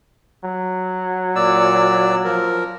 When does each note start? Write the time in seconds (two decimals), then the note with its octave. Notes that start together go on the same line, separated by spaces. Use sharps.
0.45 F#3
1.35 A#2 D5 E6
2.24 F3 A#4